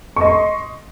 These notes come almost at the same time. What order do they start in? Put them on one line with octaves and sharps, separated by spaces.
C#6 D#5 C6